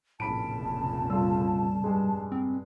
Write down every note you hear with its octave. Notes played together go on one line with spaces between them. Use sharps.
F1 A#1 A2 C#3 A5 B5 D7
D1
G3 F4 A4 E6
G2 G#3
C4